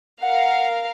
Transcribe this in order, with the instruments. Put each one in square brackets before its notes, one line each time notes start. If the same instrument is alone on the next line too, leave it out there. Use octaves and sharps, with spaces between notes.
[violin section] A#4 F5 [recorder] F#5